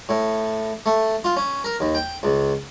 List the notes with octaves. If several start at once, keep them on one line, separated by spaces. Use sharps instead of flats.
A2
A3
F4
C#4
A#4
D#2
G5
C#2